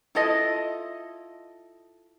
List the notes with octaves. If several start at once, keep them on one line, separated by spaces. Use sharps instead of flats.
E4 F4 A4 D#5